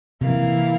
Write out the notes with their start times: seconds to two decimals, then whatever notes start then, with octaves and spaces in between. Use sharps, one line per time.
0.21 C3 E3 A#3 E4 A#4 F5